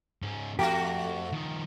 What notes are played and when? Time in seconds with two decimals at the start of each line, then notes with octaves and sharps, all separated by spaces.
0.23 G#2 C#4
0.59 F2 A3 F#4 G4
1.32 D#3 F3